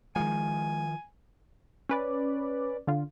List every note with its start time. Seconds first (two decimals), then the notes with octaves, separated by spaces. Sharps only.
0.16 D#3 F3 G#3 G#5
1.89 C#4 B4 D5
2.87 D3 F4